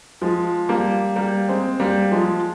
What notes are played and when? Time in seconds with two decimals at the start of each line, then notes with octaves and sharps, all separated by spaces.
0.21 F3 G#3
0.69 G3 A#3
1.16 G3 A#3
1.49 G#3 C4
1.80 G3 A#3
2.11 F3 G#3